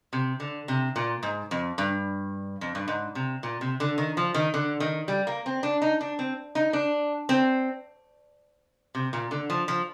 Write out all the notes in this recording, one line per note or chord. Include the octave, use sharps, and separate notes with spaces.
C3
D3
C3
A#2
G#2
F2
G2
F2
G2
G#2
C3
A#2
C3
D3
D#3
F3
D#3
D3
D#3
G3
A#3
C4
D4
D#4
D4
C4
D#4
D4
C4
C3
A#2
D3
F3
F3